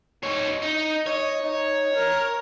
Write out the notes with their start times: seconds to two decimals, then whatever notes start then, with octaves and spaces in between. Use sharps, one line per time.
0.23 D#4 C#5
0.62 D#4
1.06 C#5 D#5
1.43 D#4
1.94 A#4